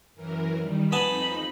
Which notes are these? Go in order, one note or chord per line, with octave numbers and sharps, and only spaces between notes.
F#2 E3 A#4
D#3 G3
F2 B3 D#4 G#5 A5 B5